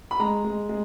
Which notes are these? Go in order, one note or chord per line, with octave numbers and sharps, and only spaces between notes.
B5
G#3 A#5
G#3
G#3